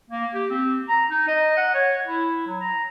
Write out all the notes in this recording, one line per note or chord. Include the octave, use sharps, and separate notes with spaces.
A#3
G4
C4
A#5
D#4
D#5
F#5
C#5
E4
F#3
A#5